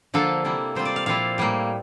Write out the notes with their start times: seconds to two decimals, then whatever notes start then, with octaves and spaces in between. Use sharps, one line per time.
0.14 D3 F3 A#3 F4 A4
0.44 C3 G3 A#3 E4
0.75 C3 G3 C4 F4 C5
0.85 D5
0.96 F5
1.06 A#2 F3 C4 E4 F5
1.38 A2 G3 A#3